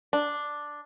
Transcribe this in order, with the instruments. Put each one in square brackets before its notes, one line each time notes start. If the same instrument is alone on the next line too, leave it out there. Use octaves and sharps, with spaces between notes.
[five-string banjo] D4